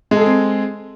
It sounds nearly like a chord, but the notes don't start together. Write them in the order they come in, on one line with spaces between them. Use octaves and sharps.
G#3 A4 G#4 C4